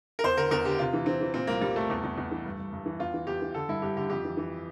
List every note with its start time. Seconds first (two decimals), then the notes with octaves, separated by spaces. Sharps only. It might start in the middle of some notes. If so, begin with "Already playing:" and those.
0.19 A#4
0.24 E2 C5
0.37 D3 A#4
0.51 E2 A#4
0.65 D3 G4
0.79 C3 F4
0.93 E3
1.06 E3 C4
1.21 E3
1.34 A#2 C4
1.47 C2 A#3
1.61 C2 G3
1.75 C2 A3
1.90 E2
2.04 E2
2.18 E2
2.31 E3
2.45 G2
2.59 G2
2.73 G2
2.86 E3
2.99 E2 F4
3.14 E3
3.27 E2 G4
3.42 E3
3.54 D3 A4
3.69 G2 E4
3.82 G2 G4
3.96 D3 G4
4.10 F2 G4
4.25 E3
4.37 E3